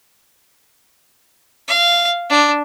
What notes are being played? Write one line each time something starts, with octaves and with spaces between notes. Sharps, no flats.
F5
D4